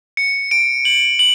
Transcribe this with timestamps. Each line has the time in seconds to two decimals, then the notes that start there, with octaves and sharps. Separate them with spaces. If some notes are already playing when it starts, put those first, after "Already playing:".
0.17 C#7
0.51 D7
0.85 F#7
1.19 F#7